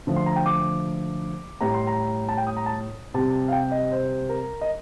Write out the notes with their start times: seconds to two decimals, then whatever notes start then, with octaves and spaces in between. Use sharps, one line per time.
0.07 D3 F3 A3
0.16 C6
0.26 A#5
0.36 G5
0.46 D6
1.61 A2 G3 A#5
1.74 C6
1.87 A#5
2.29 A5
2.37 G5
2.47 D#6
2.57 A#5
2.66 A5
3.14 C3 G3 A5
3.48 F5
3.52 G5
3.72 D#5
3.91 C5
4.29 A#4
4.61 D#5